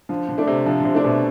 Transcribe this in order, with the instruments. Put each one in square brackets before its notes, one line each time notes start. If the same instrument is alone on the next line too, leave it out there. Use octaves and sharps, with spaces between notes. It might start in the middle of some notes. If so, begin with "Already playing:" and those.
[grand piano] D3 [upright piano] F3
[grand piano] D3
[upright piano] A3 D4
[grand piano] C3
[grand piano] D3 [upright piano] F3
[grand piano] D3
C3
[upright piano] A3 D4
[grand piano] B2